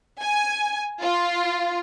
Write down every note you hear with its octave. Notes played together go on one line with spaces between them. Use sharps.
G#5
F4